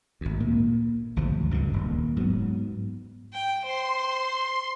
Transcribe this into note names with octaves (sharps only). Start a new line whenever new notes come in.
G#1 D2
A#2 A#3
G#1 D2 B2 F3
C#2 G2 B2 D3
D#1
G#2 F#3 B3
G5
C5 C6